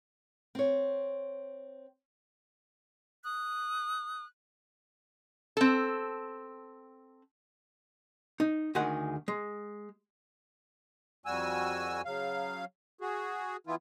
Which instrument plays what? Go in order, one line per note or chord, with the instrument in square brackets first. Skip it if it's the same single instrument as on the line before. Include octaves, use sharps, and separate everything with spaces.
[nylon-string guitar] C4 C#5
[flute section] D#6 F#6
[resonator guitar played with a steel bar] C4 A4
[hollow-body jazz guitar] D#4
D2 D#3 G#3 G#4 F#5
G#3
[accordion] F2 G3 F#4 G#5 E6
C#3 F#3 F5
F#4 G#4
E3 B3 E4 F4